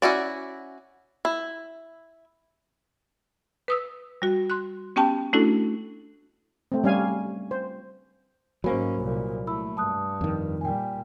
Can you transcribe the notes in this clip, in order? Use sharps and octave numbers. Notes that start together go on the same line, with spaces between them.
C#4 E4 F#4 D5
E4
B4 D#6 E6
G3 F#4
C6 F#6
B3 C#4 G4 G5 A5
A3 C#4 D4 E4 F#4 A4
A3 C4
G3 C#4 F5 G#5
C5
G#2 F#3 A#3 C#4 C5 G#5 B5
C2 A#2
A3 E4 B5 E6
G2 A5 D#6 F#6
F2 D#3
A#2 G3 G5 G#5